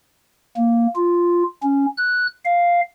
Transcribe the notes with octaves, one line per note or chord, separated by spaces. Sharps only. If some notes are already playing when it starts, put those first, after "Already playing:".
A#3
F4
C#4
F#6
F5